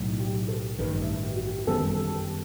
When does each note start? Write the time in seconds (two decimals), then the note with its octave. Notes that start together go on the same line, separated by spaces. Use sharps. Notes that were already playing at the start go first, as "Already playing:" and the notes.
Already playing: B1 A2 F#3 A3
0.19 G4
0.48 A4
0.79 A1 G2 D#3 B4
1.01 E5
1.23 G4
1.35 F#4
1.45 G4
1.58 G4
1.67 F#2 D#3 G3 B3 A4
2.12 G4